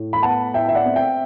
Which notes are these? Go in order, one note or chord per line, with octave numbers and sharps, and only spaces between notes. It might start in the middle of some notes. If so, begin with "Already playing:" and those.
Already playing: A2
B5
B3 F#5 A5
A2 E5 G5
E5
D5 F#5
C4
E5 G5